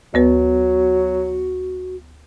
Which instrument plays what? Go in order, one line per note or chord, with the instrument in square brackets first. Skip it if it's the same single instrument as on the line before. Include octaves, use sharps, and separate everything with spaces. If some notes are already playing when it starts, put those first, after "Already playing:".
[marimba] D2 B3 B4 [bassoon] F#3 [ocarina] F#4